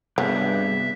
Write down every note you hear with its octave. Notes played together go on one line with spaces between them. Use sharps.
G2 C3 F#3 B3 G#4 E5